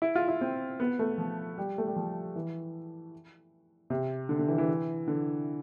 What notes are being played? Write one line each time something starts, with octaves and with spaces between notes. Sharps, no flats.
E4
F4
E4
C4
B3
A3
F3
G3
A3
G3
F3
E3
C3
D3
D3
E3
E3
D3